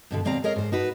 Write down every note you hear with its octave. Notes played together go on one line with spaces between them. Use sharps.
G2 B2 D3
D#2 B2 C4 D5 F5 A#5
G#4 A#4 C#5 D#5 F5
G#2 C5
D#4 F#4 B4